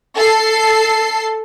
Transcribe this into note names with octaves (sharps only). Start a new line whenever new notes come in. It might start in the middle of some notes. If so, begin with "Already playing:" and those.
A4 C7